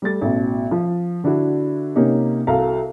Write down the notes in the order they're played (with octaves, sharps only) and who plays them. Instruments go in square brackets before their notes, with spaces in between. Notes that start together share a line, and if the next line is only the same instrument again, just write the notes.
[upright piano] G3 A3 A6
A1 B2
F3
D3 D4 E4 F#4
C3 A#3 C#4 D#4 G4
C2 F#4 A4 F5 A#5